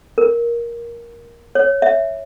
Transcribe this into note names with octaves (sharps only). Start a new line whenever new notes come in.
A#4
C#5
E5